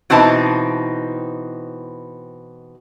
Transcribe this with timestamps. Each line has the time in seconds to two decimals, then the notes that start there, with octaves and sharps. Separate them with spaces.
0.10 B2 E3 C4 D#4 A5